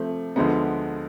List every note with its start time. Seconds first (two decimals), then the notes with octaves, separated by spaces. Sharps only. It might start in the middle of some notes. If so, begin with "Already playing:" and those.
Already playing: C3 F3 A3
0.36 D2 D3 F3 G#3 B3